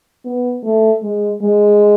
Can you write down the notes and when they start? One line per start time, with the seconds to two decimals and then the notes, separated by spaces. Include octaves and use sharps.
0.26 B3
0.64 A3
1.03 G#3
1.42 G#3